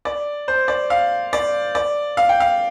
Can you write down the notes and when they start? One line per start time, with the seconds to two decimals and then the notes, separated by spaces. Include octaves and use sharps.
0.05 D5
0.48 C5
0.68 D5
0.90 F5
1.33 D5
1.75 D5
2.17 F5
2.29 G5
2.40 F5